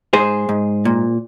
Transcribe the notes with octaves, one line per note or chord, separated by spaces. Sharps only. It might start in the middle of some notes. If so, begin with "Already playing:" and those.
G#2 G#4 C5
G#2
A#2